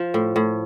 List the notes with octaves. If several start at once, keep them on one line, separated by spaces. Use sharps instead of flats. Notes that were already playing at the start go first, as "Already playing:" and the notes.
Already playing: F3
A2
A2